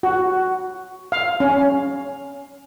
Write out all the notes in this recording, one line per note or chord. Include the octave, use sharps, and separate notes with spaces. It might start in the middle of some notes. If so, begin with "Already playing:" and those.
F#4
F5
C#4